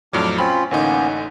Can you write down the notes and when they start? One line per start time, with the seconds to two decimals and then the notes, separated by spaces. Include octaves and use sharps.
0.13 F2 A2 F#3 D4 D6 F6
0.38 C4 C#4 F4 B5
0.71 A1 D3 A#3 B3 C#4 D#4